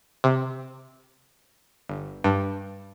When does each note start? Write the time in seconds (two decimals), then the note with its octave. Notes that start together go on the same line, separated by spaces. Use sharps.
0.24 C3
1.89 G1
2.24 G2